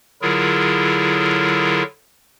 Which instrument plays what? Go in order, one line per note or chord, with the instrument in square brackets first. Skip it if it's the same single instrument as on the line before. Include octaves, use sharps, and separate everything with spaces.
[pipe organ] D3 F#3 E4 F4 G#4 A#4